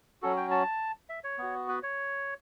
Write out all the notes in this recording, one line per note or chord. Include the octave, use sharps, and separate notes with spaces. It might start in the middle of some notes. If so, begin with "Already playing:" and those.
F#3 C#4 F#4 A4
G5
A5
E5
C#5
B3 F#4
B4
C#5